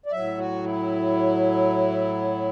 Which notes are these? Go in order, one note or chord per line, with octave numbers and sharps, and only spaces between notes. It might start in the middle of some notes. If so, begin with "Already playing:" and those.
D5
A2 F#3 E5
F#4
E4